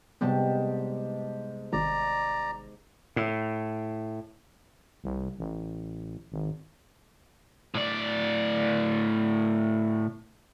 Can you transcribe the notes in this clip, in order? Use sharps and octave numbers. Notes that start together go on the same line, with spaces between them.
G#2 C3 G3 B3 G4 A5
G#1 D5 A#5
A2
C2
A1
G#1
A2 D5